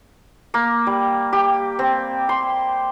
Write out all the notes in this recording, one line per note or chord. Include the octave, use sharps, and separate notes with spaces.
A#3
G3
G4
C4
C6